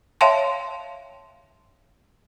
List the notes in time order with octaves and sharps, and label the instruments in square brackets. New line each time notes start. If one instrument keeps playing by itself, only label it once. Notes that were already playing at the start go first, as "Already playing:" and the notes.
[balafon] C#5 E5 F5 G5 A5 C6